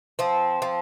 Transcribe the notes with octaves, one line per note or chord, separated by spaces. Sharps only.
F3 C4
F3